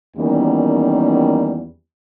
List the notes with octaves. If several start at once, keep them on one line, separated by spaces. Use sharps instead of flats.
E2 D#3 F#3 G3 A#3 C#4